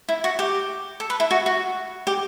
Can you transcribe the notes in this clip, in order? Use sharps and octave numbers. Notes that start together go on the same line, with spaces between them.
E4
F#4
G4
A4
B4
E4
F#4
F#4
G4